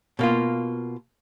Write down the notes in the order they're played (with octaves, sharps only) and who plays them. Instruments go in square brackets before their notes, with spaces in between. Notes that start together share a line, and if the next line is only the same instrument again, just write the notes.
[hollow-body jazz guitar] B2 A#3 F4